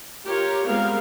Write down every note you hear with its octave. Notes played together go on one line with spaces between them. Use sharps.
F4 G4 A#4 C#5
G3 G#3 B3 C4 A#4 F5